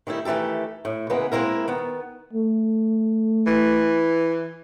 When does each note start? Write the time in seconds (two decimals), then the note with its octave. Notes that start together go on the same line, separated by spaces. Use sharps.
0.07 D#3 G3 A3 E4
0.25 D#3 E3 A3 G4 A4
0.85 A2
1.10 C#3 E3 G#3 A#3 B3 B4
1.32 G#3 A#3 C4 E4 A#4
1.68 D#3 B3
2.33 A3
3.47 E3